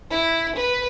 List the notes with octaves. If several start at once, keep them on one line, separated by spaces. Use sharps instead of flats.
E4
B4